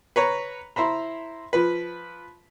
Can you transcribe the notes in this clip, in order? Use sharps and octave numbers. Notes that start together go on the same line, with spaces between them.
B4 C#5 A#5
E4 C5 A#5 B5
F3 B4